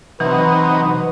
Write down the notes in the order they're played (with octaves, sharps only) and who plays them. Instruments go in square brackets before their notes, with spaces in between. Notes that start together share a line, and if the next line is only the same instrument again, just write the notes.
[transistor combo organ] C3 F#3 D#4 [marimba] E3 [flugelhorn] B4